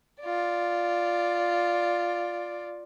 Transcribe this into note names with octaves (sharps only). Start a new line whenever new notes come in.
F4 D5